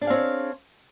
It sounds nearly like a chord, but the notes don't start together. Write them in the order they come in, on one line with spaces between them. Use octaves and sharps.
D4 G#4 F5 C4 C#5